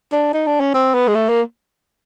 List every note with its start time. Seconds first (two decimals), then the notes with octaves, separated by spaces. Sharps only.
0.12 D4
0.33 D#4
0.46 D4
0.60 C#4
0.74 C4
0.94 B3
1.08 G#3
1.15 A3
1.29 A#3